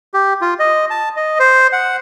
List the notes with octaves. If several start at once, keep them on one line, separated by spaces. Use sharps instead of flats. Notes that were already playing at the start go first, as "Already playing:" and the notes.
G4
F4
D#5
A5
D#5
C5
F#5